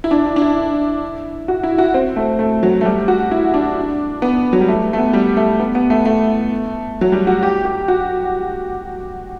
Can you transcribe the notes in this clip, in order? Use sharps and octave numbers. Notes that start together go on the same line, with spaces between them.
E4
D4
E4
D4
E4
F#4
E4
F#4
C4
A3
A3
F#3
A3
G3
F#4
E4
D4
B3
F#3
G3
A3
A3
B3
G3
A3
B3
B3
A3
A3
F#3
G3
F#4
G4
G4
F#4